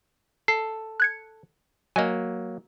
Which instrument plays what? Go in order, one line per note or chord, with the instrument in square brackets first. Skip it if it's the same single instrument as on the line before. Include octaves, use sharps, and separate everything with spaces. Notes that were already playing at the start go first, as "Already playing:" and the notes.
[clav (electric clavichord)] A4 [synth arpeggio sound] C7
[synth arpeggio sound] F#6 G#6 C#7
[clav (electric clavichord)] F#3 A#3 [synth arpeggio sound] D#5 G#5